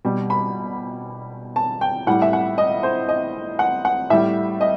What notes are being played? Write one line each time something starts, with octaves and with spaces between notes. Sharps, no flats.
B2 G3
B5
A5
G5
A2 G3 F#5
E5
F#5
D#5
C5
D#5
F#5
F#5
A2 G3 E5
D#5